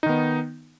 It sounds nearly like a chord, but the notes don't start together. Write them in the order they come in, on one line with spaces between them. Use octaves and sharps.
D#4 D#3 B3